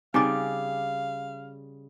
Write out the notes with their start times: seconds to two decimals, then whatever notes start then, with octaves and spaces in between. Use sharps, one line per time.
0.14 C#3 G3 C4 D#4 F5 G#5 D6 A6